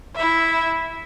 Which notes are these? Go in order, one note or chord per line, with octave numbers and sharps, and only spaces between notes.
E4 E5